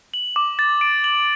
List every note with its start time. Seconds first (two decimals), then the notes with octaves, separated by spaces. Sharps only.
0.14 F#7
0.36 D6
0.59 A6
0.81 D7
1.04 F#7